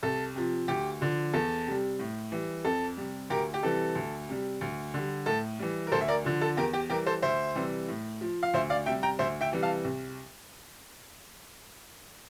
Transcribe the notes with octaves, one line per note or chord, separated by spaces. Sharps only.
C2 A4
C3 F3
D2 G4
D3 F3
E2 A4
C3 G3
A2
E3 G3
F2 A4
C3 G3
D2 G4 A#4
G4
C3 E3 G3 A4
D2
C3 G3
D2
D3 G3
A2 A4
E3 G3
A#4
D2 A4 C5
E5
A#4 D5
D3 F3
A4
E2 G4 A#4
G4
E3 G3 G4 A#4
A4 C5
D2 C5 E5
C3 E3 G3
A2
F3
F5
D2 C5 E5
D5 F5
C3 G3 E5 G5
G5 A#5
D2 C5 E5
E5 G5
C3 E3 G3
F5 A5
C2